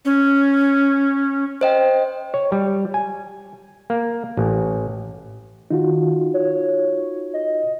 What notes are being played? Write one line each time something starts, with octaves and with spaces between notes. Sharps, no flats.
C#4
C5 D#5 G5
C#5
G3
G#5
A#3
A1
D#3 D#4 F4 F#4
C#5
D#5